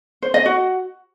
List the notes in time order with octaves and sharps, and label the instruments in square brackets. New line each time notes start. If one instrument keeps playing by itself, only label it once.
[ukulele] C5
D#5
F#4